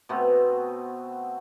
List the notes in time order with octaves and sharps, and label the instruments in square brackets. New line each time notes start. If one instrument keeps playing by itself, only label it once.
[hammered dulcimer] B2 A3 B3 C4